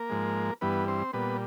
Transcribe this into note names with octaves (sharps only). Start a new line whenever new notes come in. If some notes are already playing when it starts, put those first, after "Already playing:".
Already playing: A#3 A#4
G#2 F3 G#3
G2 E3 G3 B3 B4
C4 C5
A#2 G3 B3 B4